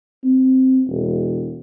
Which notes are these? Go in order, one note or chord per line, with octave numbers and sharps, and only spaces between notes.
C4
E1